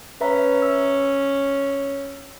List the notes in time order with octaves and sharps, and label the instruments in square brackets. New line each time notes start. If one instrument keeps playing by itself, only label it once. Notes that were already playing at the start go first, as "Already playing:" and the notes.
[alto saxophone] C#4 [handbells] B4 E5 A#5
[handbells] E6